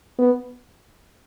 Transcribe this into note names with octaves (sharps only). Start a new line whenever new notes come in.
B3